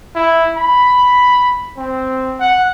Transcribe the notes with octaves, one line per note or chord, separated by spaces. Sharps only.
E4
B5
C4
F#5